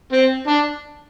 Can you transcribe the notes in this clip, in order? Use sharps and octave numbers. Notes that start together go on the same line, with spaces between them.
C4
D4